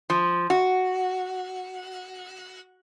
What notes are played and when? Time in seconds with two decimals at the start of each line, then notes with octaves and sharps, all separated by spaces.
0.10 F3
0.50 F#4